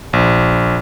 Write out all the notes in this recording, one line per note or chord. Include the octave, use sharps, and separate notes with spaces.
A#1